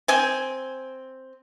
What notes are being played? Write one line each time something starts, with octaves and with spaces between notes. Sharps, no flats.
C4 G#5